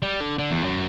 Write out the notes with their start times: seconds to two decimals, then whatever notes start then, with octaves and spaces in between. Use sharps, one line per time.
0.02 G3
0.20 D3
0.38 D3
0.51 E2
0.62 F#2